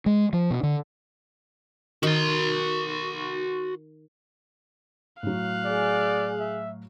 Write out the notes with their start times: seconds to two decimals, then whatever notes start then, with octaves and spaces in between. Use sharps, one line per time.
0.06 G#3
0.33 F3
0.51 B2
0.63 D3
2.03 D#3 F#4 C6
5.23 A2 F#3 F5 F#6
5.65 G#4 D5
6.40 E5